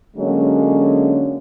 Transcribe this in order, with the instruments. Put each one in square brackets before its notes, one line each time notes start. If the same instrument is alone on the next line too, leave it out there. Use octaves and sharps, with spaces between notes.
[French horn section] D3 F#3 G#3 A#3 C#4